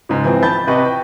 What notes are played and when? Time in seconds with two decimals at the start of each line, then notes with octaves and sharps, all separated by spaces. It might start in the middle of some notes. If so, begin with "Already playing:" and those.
0.09 C#2 G#2
0.25 E3 F3 C4
0.43 A5 B5 G6 A6
0.67 C3 B4 D#5 C#6
0.85 G5